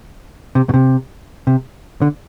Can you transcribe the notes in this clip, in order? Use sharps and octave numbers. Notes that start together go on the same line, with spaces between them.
C3
B2
C3
C3
D3